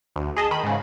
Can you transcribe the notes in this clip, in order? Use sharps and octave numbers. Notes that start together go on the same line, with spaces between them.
D2
G#4 D#5 A5
D#3 B5
G#2 C#3